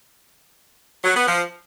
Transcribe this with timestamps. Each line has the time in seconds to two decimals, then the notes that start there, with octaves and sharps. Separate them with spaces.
1.03 F#3
1.15 B3
1.26 F3